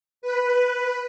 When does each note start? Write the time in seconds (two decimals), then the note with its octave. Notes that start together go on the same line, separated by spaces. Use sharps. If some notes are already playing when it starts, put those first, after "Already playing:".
0.22 B4